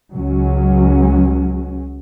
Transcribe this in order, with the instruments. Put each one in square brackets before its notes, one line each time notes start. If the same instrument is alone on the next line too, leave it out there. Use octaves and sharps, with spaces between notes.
[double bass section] C#2 F#3 C#4